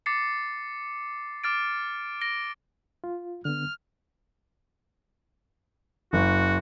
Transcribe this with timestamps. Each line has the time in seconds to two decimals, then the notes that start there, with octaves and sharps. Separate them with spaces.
0.06 D6 A6 C7 C#7
1.44 D6 F6 A6 D7
2.21 A#6 D7 G7
3.04 F4
3.45 D3 B3 F6
6.13 F#1 F#4